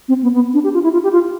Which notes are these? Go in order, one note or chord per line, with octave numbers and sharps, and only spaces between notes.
C4
B3
B3
D4
G4
F4
E4
F4
G4
F4